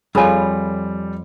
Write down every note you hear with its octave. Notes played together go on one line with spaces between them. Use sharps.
F2 G3 F4 G#4 A4 C#5 G#5 B5